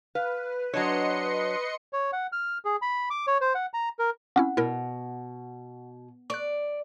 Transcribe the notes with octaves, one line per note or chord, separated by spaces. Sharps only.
B4 F5
F#3 D4 C#5 D#5 C6 C#7
C#5
F#5
F6
G#4
B5
D6
C#5
C5
F#5
A#5
A#4
C4 C#4 E4 F#5
B2 E4 A#4
D5 C#6 F#6